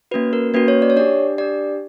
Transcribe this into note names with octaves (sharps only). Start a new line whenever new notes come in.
A#3 C#4 F#4 B4
A#4
A#3 C#4 F#4 B4
C#5
D5
C#5
D4 G4 D5
D4 G4 D5